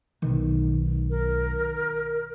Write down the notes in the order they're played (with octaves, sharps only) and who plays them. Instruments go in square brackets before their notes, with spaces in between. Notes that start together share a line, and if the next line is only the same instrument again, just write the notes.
[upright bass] B1 [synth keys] D#3
[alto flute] A#4